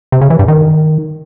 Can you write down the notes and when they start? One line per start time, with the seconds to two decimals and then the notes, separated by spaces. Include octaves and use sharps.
0.12 C3
0.21 C#3
0.30 E3
0.39 G2
0.48 D#3